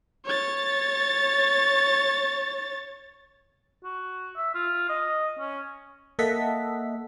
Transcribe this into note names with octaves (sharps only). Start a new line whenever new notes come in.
C#5 A6
F#4
E5
F4
D#5
C#4
A#3 A4 D#5 E5 F#5 B6